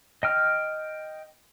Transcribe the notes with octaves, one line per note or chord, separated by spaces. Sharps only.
D#5 G5 F6